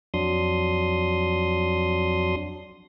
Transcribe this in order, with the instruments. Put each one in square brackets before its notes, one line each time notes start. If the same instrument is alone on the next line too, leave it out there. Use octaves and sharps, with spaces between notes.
[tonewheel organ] F2 F#3 D4 C6 D#6